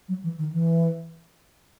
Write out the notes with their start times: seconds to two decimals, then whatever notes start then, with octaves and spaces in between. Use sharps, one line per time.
0.09 F#3
0.23 E3
0.39 D#3
0.53 E3